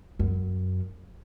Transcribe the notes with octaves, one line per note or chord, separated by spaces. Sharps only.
F#2